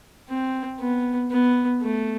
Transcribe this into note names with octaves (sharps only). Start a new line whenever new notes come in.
C4
B3
B3
A3